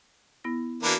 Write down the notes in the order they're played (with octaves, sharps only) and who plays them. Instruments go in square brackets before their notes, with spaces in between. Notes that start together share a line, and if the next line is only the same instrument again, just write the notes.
[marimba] B3 E4 A#6
[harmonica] E3 A#3 D4 [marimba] F#4 B5